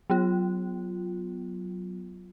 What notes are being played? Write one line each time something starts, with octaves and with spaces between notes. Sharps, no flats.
F#3 B3 F4